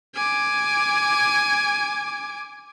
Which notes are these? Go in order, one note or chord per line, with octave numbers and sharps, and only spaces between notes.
G#5 D6